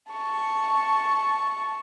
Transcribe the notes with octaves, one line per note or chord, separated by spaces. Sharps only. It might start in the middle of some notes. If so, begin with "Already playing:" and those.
A5 C#6